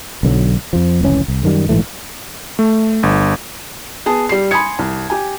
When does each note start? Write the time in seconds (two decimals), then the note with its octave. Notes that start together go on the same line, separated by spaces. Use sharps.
0.23 B1 D3 D#3 F#3
0.73 F2 F3
1.01 F1 C#2 E3 C#4
1.28 C2
1.43 F#2 D#3 G3
1.69 A#1 G#2 E3 A3
2.59 A3
3.03 G1
4.06 B3 G#4 A5
4.29 G3 C7
4.51 G#5 B5 C6 D#6 G#6 C#7
4.79 C2
5.10 G4 G#5